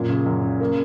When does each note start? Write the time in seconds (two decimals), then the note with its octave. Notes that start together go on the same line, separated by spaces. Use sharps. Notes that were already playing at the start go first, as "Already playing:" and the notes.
Already playing: F#2 A#2
0.09 C#3
0.26 F#2
0.43 C#3
0.60 A#3